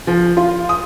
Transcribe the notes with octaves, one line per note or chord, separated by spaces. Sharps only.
F3
F4
D#6